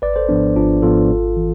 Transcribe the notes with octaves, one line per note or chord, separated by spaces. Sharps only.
G#1 B4 D5
A4 C5
G#2 F3 B3 D4
G#1 D4 F4
G#2 F3 B3 F4 A4
G#1
E3